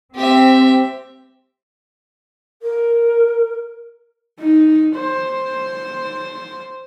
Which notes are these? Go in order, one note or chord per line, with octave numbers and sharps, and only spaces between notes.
C4 G4 E5
A#4
D#4
C5